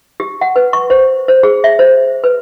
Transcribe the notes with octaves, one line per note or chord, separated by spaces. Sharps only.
G4
F#5
B4
C#6
C5
C5
G#4
E5
C5
B4